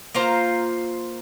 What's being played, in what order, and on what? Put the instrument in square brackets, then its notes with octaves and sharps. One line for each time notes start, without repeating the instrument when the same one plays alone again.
[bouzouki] A#3 F4 C5 A#5